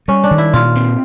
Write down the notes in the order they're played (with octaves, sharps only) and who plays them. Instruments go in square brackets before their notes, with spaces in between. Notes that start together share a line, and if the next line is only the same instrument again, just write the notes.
[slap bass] G3 [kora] C#4
[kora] D4
[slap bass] D#3
[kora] E4
[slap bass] A#2 [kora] F4
[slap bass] C4